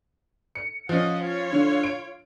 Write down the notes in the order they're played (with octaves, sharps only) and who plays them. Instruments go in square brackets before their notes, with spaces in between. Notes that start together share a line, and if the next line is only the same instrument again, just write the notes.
[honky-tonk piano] C#7
[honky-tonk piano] F3 C#4 [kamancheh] D#5 F#5
[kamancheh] F4 C#5
[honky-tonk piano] D3
D7